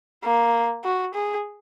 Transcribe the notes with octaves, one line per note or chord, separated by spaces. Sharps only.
A#3
F#4
G#4